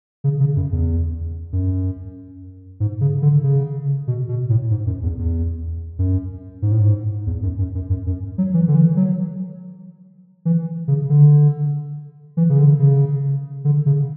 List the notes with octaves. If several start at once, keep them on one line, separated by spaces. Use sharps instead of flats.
C#3
C#3
F#2
E2
F#2
G#2
C#3
D3
C#3
B2
B2
A2
G#2
F#2
E2
E2
F#2
G#2
A2
G#2
E2
F#2
F#2
F#2
F#2
F#2
F#3
E3
D3
E3
F#3
E3
C#3
D3
E3
C#3
D3
C#3
D3
C#3